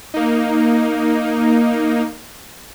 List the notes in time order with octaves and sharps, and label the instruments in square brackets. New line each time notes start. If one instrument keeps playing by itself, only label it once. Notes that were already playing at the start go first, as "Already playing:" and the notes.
[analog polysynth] A#3 D#4